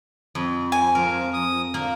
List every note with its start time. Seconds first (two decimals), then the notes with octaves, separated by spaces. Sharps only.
0.35 F2
0.72 G#5
0.95 F3 A#4
1.33 D#6
1.74 D3 A#3